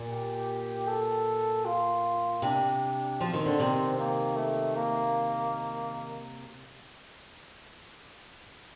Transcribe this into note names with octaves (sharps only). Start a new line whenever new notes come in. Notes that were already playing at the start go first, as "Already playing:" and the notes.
Already playing: A#2
G4
A4
F4
C3 D4
F3 C4
D#3
D3
C3 D#3
A#3
A3
A#3